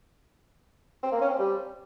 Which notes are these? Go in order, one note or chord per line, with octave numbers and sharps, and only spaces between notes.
C4
A#3
C#4
C4
G3